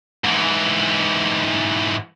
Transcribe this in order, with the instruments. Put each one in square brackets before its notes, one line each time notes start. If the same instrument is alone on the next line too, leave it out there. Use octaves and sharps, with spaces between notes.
[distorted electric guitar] G#2 E3